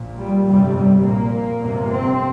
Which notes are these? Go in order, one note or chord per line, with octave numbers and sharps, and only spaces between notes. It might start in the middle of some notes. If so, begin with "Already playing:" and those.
Already playing: A#1 A#2
G3
G1 F2 C3 G3
G3
A#1 A#2 A#3
G1 F2 C3
C4